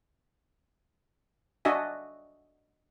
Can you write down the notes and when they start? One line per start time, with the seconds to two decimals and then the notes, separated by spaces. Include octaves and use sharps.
1.65 D4 F#4 D#5 E5 G#5